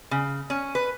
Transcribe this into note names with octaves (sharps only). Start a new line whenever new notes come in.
C#3
C#4
B4